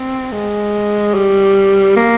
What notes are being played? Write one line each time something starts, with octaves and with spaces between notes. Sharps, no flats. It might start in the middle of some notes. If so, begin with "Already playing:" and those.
Already playing: C4
G#3
G3
A#3